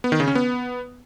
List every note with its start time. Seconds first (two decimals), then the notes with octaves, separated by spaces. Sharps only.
0.04 B3
0.12 D#3
0.20 C#3
0.28 C#4
0.35 B3